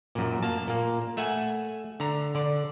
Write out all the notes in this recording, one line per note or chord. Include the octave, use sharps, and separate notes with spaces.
F#2 A#2
A#3 A5
A#2 A#3
A3 E5 F#5 G#5
D3 A#5
D3 D5